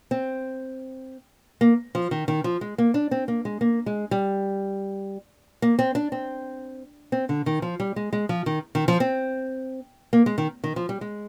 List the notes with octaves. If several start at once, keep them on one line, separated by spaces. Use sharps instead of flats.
C4
A#3
F3
D#3
D#3
F3
G#3
A#3
D4
C4
A#3
G#3
A#3
G#3
G3
A#3
C4
D4
C4
C4
D3
D#3
F3
G3
G#3
G#3
F3
D#3
D#3
F3
C4
A#3
G#3
D#3
D#3
F3
G3
G#3